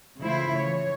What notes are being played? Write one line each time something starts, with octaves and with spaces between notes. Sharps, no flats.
C#3 E3 A3 E4 F4 C5
E3 C#5